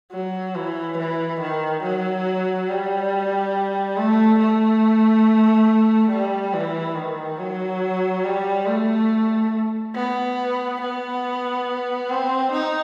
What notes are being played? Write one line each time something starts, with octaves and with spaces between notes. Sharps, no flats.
F#3
E3
E3
D#3
F#3
G3
A3
A3
G3
E3
D#3
F#3
G3
A3
B3
B3
C4
D#4